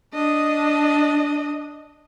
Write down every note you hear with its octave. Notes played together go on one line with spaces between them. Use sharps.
D4 D#5